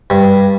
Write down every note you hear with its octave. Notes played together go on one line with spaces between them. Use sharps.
G2